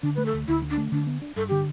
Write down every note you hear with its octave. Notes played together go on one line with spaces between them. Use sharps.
D3 D4
A3 B4
A4
D2
D2 E4
D3
D4
A3
D3 D4
B3
D4
G2 A4
D3 G4